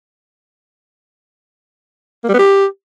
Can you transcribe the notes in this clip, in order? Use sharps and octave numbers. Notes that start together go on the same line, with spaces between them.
A#3
G3
B3
G4